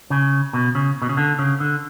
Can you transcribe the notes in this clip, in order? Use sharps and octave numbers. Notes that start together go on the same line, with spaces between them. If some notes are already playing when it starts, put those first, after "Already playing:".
C#3
B2
C#3
B2
C#3
D3
C#3
D3